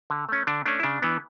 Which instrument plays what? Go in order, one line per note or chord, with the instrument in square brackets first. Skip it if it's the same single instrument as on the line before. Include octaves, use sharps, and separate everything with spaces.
[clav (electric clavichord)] D3
A3 C#4
D3 D4
A3 C#4 D4
E4
C#3 D4
E3 B3